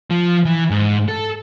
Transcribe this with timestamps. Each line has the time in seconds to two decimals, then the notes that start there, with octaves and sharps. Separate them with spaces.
0.10 F3
0.45 E3
0.70 G#2
1.09 A4